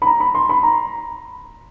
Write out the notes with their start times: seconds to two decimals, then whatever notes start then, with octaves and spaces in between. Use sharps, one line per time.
0.02 B5
0.07 A#5
0.20 B5
0.35 C6
0.49 B5
0.63 A#5